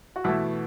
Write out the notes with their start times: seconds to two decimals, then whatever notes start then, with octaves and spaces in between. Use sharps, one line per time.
0.16 F#4
0.24 B2 E3 A3 E4